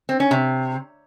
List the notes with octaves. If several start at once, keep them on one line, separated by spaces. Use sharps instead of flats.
C4
C#4
C3